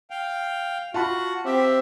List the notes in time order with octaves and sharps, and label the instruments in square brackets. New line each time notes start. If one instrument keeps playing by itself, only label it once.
[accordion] F5 G5
[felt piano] F4 A5 B5 [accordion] F#4 F#5
[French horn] C4 [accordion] G4 E5